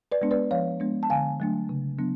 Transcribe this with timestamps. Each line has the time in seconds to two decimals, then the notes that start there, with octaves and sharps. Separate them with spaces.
0.12 B4 D5
0.22 G#3 B3 D4
0.31 B4 D5
0.51 F3 C#5 F5
0.80 G#3 B3 D4
1.03 A5
1.10 D3 F5 G#5
1.40 F#3 A3 D4
1.69 C#3
1.99 F#3 B3 D4